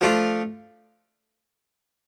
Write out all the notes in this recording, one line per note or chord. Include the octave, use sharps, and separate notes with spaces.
F3 A3 D4 F4